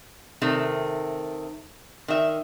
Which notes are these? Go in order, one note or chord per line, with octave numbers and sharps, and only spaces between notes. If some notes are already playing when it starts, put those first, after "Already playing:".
C3 D#3 A3
D#3 E5